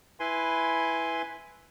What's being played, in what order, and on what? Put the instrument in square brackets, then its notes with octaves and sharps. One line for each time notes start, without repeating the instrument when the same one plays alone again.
[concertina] E4 B4 G#5 C6